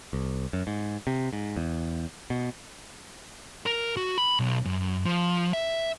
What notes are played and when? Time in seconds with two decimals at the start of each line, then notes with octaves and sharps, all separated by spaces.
0.13 C2
0.53 F#2
0.67 G#2
1.07 C3
1.33 G#2
1.56 E2
2.30 B2
3.66 A#4
3.97 F#4
4.18 B5
4.40 B1
4.65 F#2
5.05 F3
5.53 E5